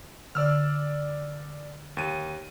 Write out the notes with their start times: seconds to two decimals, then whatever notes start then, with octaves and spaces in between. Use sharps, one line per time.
0.35 D3 D5 E6 F6
1.97 D#2 D#7